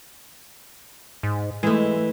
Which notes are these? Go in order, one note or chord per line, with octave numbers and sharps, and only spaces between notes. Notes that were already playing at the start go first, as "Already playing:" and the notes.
G#2
E3 G#3 A3